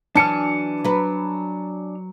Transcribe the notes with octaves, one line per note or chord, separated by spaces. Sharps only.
E3 F#3 D4 G#5 A5 F6 C#7
F#3 B4